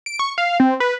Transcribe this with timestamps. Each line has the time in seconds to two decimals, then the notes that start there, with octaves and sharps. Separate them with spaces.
0.06 D7
0.19 C#6
0.38 F5
0.60 C4
0.80 B4